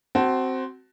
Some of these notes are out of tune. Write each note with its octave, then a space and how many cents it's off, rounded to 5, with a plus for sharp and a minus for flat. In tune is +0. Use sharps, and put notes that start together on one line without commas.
C4 +0 F#4 +20 A5 +0